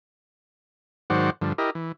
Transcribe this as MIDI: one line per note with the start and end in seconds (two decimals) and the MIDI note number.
1.10 1.30 44
1.10 1.30 51
1.10 1.30 54
1.10 1.30 72
1.10 1.30 74
1.10 1.30 78
1.41 1.53 43
1.41 1.53 50
1.41 1.53 53
1.58 1.70 64
1.58 1.70 67
1.58 1.70 70
1.58 1.70 75
1.75 1.92 52